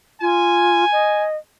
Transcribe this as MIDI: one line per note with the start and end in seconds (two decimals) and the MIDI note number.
0.21 0.85 65
0.21 1.24 80
0.92 1.36 75